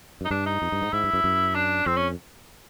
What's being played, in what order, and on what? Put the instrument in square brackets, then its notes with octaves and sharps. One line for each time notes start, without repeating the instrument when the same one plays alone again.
[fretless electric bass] F#2 [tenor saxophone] D#4
[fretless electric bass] G2 [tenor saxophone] D4
[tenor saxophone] D#4
[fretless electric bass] F2
G2
G#2
[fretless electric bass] G#2 [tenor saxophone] E4
[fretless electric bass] G2
F#2
F#2
[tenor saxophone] D4
[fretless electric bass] F2 [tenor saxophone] C4
[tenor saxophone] C#4